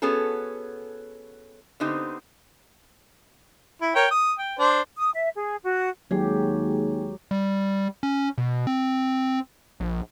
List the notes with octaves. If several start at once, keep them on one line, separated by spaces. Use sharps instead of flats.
B3 C#4 F#4 G#4 A4
D3 B3 C4 D#4 G4 C5
E4
A#4 C#5 G5
D#6
G5
D4 C5
D#6
E5
G#4
F#4
D#2 F#3 G#3 G4 G#4
G3
C#4
B2
C4
A#1